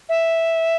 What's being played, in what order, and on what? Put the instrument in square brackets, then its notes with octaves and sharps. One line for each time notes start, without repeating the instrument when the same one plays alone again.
[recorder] E5